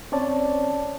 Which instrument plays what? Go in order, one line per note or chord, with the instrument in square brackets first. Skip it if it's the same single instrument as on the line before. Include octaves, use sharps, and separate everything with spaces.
[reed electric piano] C4 C#4 C#5 D5 A5